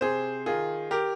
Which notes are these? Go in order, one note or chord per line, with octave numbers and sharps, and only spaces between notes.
C3 G#4 C5
D#3 F4 G#4
G4 A#4